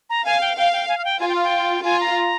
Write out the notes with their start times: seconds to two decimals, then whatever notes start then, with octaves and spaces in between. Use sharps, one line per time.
0.10 A#5
0.25 F5 G#5
0.41 G5
0.57 F5 G5
0.73 G5
0.89 G#5
0.97 F5
1.05 G5
1.20 F4 G#5
1.29 G5
1.35 F5
1.44 G5
1.84 F4 G#5
2.00 A#5